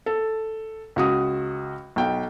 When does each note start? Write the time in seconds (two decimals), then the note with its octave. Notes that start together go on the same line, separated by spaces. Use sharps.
0.06 A4
0.96 C#2 F#4 D#6
1.96 B1 G5